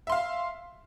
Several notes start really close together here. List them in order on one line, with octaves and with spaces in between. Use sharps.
E5 C6 F5